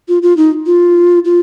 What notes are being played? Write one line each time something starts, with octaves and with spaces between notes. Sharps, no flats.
F4
F4
D#4
F4
F4